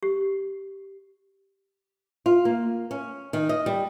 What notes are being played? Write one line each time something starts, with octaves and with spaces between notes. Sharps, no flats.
G4
F4
A#3
C#4
D#3
D#5
G3